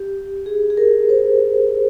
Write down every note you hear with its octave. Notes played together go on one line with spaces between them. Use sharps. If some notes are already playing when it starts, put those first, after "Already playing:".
Already playing: G4
G#4
G#4
A#4
C5